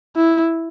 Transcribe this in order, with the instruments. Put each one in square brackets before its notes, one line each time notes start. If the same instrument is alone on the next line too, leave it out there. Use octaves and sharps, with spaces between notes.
[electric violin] E4